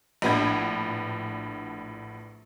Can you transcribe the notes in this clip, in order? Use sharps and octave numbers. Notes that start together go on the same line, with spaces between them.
A#1 A2 B3 D4 B5 G#6